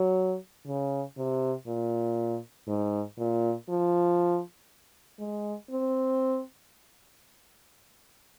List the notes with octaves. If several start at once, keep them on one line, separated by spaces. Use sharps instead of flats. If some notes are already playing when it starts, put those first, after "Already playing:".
Already playing: F#3
C#3
C3
A#2
G#2
A#2
F3
G#3
C4